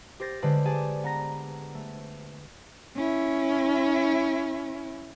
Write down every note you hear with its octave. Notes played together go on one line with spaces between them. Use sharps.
G4 C5 A6 A#6
D3 G#3 D4 B4 C5
G4 G#4 D5 G#5 A5
B3 A#5 A#6
A3
C#4 E4